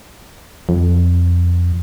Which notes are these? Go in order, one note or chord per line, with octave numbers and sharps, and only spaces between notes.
F2